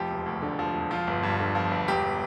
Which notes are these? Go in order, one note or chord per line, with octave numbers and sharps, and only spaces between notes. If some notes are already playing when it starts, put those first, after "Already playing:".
Already playing: F1 F3 G4
E1
D2
D3
F3
E1
F3 F4
G1
G2
D3
F3
G1
E1 G4